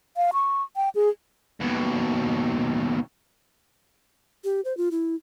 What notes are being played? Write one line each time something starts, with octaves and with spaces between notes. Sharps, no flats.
F5
C#6
G5
G#4
D#2 B2
G4
C5
F4
E4